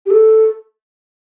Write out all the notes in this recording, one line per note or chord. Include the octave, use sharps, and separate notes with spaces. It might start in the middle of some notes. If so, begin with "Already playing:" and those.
G4
A4